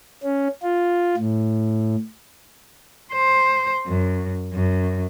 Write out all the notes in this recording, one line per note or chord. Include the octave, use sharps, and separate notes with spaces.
C#4
F4
A2
C5
F#2
F#2